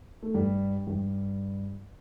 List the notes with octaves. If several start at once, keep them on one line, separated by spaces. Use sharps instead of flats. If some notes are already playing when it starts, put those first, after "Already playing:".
A3
G2 G3
G2 G3